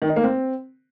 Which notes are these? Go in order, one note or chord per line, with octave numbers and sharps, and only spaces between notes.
D#3
D#4
A#3
C4